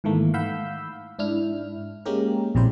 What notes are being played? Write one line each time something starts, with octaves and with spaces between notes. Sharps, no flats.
G#2 D#3 E3 A3 A#3
F5 F#5 B5 E6 G6
G#2 D4 E4 F6
G#3 A#3 C#4 G4 A#4
A#1 C3 G3 E4 C5